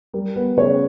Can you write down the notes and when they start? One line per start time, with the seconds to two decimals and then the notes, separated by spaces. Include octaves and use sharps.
0.14 G3 A#4
0.36 B3 B4
0.57 C#3 C#5